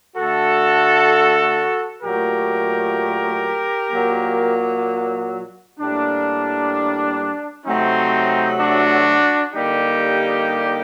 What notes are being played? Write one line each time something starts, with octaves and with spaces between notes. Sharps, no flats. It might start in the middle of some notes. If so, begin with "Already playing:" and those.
D3 A3 F#4 A4
A#2 F#3 A3 G4 A#4
A#2 F#3 A#3
A2 G3 A#3 D4
C3 F#3 A3 C4 D#4
D4 F#4
D3 G3 A#3 D#4 G4